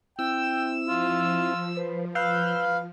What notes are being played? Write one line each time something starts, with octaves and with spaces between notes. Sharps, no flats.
C4 E4 G5 E6
F3 F4
B4 C5
B4 F5 E6 F#6 G6